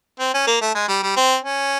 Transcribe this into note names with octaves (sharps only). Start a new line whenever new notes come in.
C4
C#4
A#3
A3
G#3
G3
G3
C4
C#4